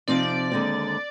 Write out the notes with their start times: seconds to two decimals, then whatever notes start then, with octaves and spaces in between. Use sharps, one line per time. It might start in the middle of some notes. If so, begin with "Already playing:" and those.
0.08 C3 F3 C4 D#4 D5
0.52 D#2 D3 G#3 C4